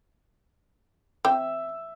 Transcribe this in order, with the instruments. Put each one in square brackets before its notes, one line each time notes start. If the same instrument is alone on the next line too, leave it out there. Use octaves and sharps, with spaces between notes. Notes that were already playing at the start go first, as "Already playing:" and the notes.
[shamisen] C4 G5 [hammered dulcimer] E5